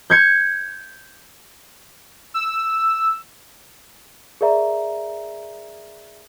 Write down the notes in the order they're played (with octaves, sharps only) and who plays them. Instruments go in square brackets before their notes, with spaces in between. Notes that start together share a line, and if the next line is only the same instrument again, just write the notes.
[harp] G6 G#6 C#7
[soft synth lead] E6
[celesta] G#4 A#4 D5 E5 A#5